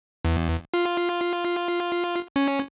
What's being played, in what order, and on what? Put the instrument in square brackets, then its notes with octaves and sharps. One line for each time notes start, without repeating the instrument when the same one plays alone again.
[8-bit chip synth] E2
F4
C#4